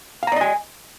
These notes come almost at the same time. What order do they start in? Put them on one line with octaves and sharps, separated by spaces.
F5 A#5 D5 D#5 G#5